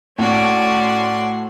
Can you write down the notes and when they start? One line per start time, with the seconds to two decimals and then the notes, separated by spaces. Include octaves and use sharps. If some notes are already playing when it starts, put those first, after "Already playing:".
0.18 A2 C#4 F#4 D5 C6